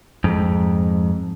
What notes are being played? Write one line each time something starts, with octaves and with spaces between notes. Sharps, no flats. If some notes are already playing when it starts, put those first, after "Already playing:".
F2 G#2